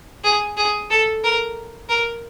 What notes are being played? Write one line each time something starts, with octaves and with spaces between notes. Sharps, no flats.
G#4
G#4
A4
A#4
A#4